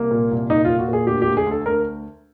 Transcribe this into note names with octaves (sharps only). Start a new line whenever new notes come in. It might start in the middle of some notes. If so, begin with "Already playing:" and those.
Already playing: C2 A#3
A#2
C2
A#2 D#4
A#2 F4
F#4
A#2 G#4
D2 G4
G4
D2
G#4
D2 A4
D2 A#4